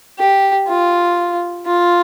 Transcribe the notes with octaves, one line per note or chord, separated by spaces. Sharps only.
G4
F4
F4